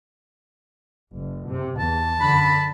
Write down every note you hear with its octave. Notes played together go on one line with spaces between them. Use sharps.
F#1
C3
E2 A5
F#2 D3 B5